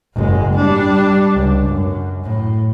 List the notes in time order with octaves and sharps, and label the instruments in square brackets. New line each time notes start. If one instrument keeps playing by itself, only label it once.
[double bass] F#1 G#3
G3 D4
C#2
F#2
A2